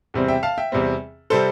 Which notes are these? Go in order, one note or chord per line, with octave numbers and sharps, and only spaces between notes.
E2 C3 G3 C4
E5 G5
F5 A5
E5 G5
E2 C3 G3 C4
C3 G3 C4 A4 C5